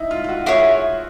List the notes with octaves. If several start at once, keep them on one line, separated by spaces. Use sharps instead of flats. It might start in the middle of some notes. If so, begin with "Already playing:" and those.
Already playing: D#4 E4
F4
F4
F#4
E4 F#4 G#4 C#5